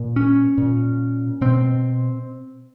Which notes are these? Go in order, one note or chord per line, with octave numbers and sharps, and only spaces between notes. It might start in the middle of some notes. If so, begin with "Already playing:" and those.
Already playing: A#2
C#4
A#2
B2 C4